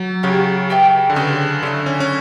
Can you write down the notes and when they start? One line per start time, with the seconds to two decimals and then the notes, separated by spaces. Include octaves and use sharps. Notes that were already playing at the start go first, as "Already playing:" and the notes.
Already playing: F#3
0.23 C#3 G4 C#5 F#5
0.70 G4 B4 E5 G5
1.10 D3
1.16 C#3 C#4 G4 B4
1.63 D3 A3 C#4 E4
1.86 C#4
2.00 C#4